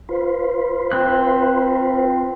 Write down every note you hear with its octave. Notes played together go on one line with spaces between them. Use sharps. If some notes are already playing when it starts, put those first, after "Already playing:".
F4 B4 C5
C4 F#6